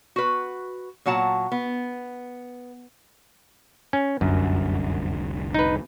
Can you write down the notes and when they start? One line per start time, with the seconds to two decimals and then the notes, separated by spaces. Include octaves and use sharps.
0.16 F#4 B4
1.06 A#2 F#3 F#5 A5 A#5
1.52 B3
3.93 C#4
4.21 F1 C2 F#2 D3
5.54 D#4 B4